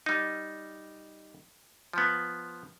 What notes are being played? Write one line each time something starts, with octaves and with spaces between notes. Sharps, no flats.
G3 D#4
F3 B3